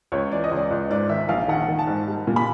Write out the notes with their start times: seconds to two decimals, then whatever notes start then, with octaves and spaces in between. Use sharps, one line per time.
0.12 C#2 C#5
0.32 E3 D5
0.44 D#5
0.51 C#2
0.56 D5
0.71 C#2
0.90 G#2 D5
1.09 D#3 E5
1.29 A#1 F5
1.48 D#3 F#5
1.68 D#3
1.79 A5
1.87 G#2
2.08 G3
2.27 A#2
2.36 B5